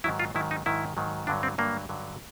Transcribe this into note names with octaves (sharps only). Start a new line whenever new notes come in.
G#2 D#3 F#3 E4
F4
G#2 D#3 F#3 E4
D#4
G#2 D#3 F#3 E4
G#2 D#3 F#3
G2 D3 F#3 D4
C4
G2 D3 F#3 A#3
G2 D3 F#3